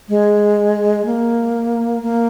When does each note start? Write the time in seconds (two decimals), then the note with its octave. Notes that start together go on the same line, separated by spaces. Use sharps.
0.09 G#3
1.05 A#3
2.02 A#3